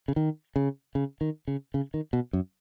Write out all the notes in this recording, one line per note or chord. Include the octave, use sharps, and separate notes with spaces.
C#3
D#3
C#3
C#3
D#3
C#3
C#3
D#3
B2
F#2